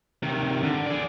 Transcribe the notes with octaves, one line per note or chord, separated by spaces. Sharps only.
C3 D#3
D3
G#4 D5